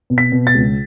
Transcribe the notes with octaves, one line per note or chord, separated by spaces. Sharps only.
B2
B6
B2
A6
C#2